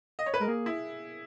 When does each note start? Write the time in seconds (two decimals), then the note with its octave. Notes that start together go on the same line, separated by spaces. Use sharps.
0.19 D#5
0.26 C#5
0.34 B4
0.40 G#3 A#4
0.48 A#3 G#4
0.66 E4